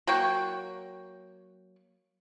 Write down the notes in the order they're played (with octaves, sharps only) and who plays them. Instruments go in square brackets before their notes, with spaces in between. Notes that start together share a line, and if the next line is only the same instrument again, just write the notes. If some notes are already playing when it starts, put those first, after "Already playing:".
[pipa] F#3 A#3 G5 C#6